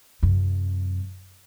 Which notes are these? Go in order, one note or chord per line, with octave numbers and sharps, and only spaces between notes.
F#2 C3